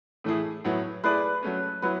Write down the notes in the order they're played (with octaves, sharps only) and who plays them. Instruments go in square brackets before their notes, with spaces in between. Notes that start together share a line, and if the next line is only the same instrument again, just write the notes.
[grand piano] A2 E3 A3 E4 G#4
A2 F#3 B3 E4
[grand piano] A3 E4 G#4 D5 [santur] B4
[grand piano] F#3 A3 C#4
[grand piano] F#3 B3 E4 [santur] B4